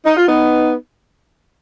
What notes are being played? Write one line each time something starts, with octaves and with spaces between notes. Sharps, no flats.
D#4
F4
B3 D#4